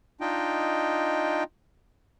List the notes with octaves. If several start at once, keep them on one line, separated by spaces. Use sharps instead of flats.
D4 D#4 F4 D#5 G5